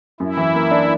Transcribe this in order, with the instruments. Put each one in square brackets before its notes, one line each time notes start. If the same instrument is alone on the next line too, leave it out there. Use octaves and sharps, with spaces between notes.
[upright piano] F#2 [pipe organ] E4
[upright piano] E3
A#3
D4